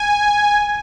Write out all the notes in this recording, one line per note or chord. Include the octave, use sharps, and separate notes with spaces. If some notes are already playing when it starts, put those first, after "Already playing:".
Already playing: G#5